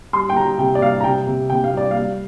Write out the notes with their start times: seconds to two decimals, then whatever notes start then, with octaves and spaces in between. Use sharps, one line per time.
0.13 G3 C6
0.30 G5
0.36 G3 A#5
0.59 C3 G5
0.75 D5
0.81 G3 F5
1.00 A#5
1.04 C3 G5
1.27 C3
1.50 C3 G5
1.64 F5
1.72 G3 D5
1.91 F5
1.96 G3